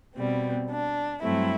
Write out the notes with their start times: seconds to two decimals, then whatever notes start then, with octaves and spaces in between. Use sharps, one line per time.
0.16 B2 G3 C4
0.69 D4
1.23 G2 F#3 A3 C4 E4